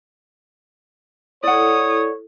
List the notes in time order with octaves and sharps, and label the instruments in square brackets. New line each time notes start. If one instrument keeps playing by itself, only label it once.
[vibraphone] E4 A4 [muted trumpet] C#5 [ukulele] D5 F#5 [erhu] D#6